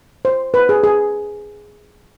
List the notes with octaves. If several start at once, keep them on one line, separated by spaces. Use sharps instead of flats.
C5
B4
G#4
G#4